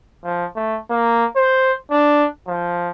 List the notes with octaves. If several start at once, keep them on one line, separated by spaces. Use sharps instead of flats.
F3
A3
A#3
C5
D4
F3